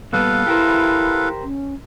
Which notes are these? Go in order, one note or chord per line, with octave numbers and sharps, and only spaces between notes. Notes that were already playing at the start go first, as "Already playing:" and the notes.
A#2 G3 B3 A4 B4 F5
E4 G4 A#4 C5
C#4